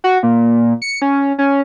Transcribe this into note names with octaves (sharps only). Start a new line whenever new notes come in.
F#4
A#2
C#7
C#4
C#4